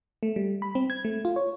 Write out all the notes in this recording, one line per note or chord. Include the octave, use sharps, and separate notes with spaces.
A3
G3
B5
C4
G#6
A3
F4
C#5